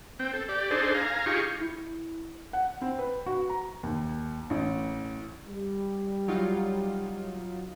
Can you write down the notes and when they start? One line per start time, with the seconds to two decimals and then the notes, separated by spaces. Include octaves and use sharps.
0.19 C4 G5
0.33 A4
0.49 G4 D5
0.71 D4 D#4 G#4 A4 C5
0.95 F5 G#5 A#5
1.26 D#4 F4 G4 G#4 C#6
1.61 E4
2.53 F#5
2.82 C4
2.99 B4
3.26 F#4
3.50 A#5
3.83 D#2
4.50 A1
5.47 G3
6.28 F#3 D#4 F4